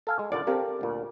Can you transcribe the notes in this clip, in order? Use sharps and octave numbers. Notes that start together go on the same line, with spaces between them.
A4 F5 G#5
G#3
D#2 A#2 D3 D5
C4 G4 A4 A#4 F5
D2 A#2